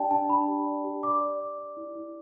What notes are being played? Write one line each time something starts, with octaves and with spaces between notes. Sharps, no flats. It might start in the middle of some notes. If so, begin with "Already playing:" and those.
Already playing: D4 G4 D5 G5 A5
D4 A5
D4 B5
G4
D5
G4
D5 D6
D5
D5
D5
E4
E4